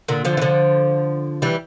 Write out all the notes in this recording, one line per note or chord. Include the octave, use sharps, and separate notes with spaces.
A#2 D3
D3 F3
E3
D3 F3
E3 G3